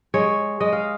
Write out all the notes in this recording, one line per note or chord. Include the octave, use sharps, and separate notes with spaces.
G#3 C#5
G#3 D#5
F5